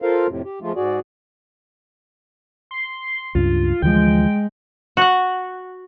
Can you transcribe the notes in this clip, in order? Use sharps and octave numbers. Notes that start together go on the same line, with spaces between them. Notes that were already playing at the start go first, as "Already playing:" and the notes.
F4 A4 A#4 C5 F5
F2 A2 C3
G4
F3 G#3 A3 F4
G#2 F#4 G#4 D5
C6
C#2 G2 F4
D2 E3 F3 G#3 G5
F#4 F#5